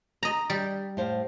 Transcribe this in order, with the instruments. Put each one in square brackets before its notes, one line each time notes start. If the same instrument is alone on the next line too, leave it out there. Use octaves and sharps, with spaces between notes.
[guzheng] D#5 A#5
G3
[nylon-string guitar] A2 C5 F5